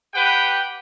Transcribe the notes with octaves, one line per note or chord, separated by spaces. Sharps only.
G4 B4 F#5 G5